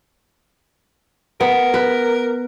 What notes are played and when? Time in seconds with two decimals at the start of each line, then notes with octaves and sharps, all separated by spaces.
1.41 B3 A#4
1.74 B4